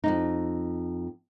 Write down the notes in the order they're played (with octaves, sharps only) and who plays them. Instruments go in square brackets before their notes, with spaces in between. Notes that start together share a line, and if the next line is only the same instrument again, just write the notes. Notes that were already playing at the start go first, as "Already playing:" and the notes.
[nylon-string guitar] F2 G#2 D#4